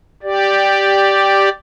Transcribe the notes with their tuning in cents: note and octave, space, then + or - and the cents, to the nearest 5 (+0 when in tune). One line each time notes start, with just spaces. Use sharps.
G4 +0 D5 +0